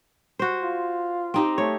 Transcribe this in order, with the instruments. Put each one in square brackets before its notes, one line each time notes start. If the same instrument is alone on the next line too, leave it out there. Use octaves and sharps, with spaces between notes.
[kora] F#4 C5
[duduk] F4
[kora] C4 D#4 G4
[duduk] A3 [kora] C#5